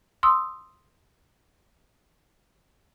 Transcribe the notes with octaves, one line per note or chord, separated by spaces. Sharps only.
C6 D#6 E6